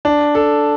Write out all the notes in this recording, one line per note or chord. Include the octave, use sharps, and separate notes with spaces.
D4
A4